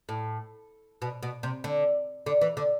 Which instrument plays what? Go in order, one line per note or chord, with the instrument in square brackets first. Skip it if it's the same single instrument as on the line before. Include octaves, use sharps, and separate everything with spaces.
[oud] A2
B2
B2
C3
D3
D3
E3
D3